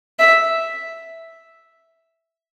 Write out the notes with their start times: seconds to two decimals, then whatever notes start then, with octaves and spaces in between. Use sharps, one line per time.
0.19 E5